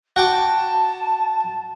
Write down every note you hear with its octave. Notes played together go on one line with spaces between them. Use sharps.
F#4 G5 A5 D6